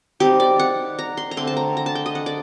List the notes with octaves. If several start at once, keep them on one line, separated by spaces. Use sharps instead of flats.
G3 C4 D#4 G4
D5
F#5
A#5
C6
A#5
D3 A3 C4 C6
A5
A#5
A#5
A5
G5
D#5
F#5
D5